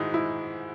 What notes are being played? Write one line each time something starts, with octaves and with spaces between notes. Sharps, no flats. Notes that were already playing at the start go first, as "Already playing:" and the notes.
Already playing: G#2 D#3 G#3 D#4 E4 F#4
E4